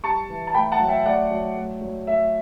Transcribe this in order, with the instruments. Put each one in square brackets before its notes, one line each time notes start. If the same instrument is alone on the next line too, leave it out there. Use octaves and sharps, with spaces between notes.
[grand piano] G3 A5 C#6
E3
A5
A3 G5 B5
F#5 A5
F#3
E5 G5
A3 D5 F#5
F#3
A3
F#3
A3 E5